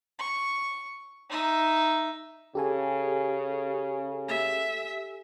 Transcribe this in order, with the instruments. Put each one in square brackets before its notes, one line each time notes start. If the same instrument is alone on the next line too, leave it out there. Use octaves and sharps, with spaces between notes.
[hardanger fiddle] C#6
D#4 E5
[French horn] C#3 [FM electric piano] G4 A4 G#5
[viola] E5